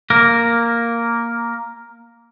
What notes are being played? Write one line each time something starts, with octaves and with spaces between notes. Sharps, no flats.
A#3 A#4